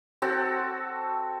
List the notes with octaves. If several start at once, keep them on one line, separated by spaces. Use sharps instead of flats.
C4 F#4 A4